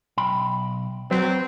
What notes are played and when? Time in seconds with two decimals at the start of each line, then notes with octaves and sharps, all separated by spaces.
0.17 B1 G5 B5
1.11 F#3 C4 B4